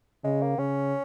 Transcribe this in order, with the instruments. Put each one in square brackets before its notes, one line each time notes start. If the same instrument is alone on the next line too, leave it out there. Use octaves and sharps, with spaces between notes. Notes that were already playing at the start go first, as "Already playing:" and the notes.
[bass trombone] C#3 [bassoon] G#3
[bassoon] A#3
[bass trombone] C#3 [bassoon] C#4